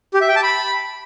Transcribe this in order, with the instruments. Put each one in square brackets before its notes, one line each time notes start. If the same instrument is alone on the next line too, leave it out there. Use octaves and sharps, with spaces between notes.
[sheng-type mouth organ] G4
E5
G5
A5
B5